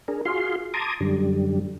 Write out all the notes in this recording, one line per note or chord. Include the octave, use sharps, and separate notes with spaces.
D4 G#4 A#4
F4 F#4 G#4 F5 C6
A5 A#5 C6 D6 D#6 G#6
F#2 D3 G3